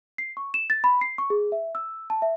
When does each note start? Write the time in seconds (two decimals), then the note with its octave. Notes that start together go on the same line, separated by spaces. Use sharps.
0.18 C7
0.37 C#6
0.54 E7
0.70 A6
0.84 B5
1.01 C7
1.18 C#6
1.30 G#4
1.52 E5
1.75 E6
2.10 A5
2.22 E5